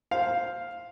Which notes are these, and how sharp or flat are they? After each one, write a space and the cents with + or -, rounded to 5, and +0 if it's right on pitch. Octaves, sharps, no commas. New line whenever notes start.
C5 +0 F5 +0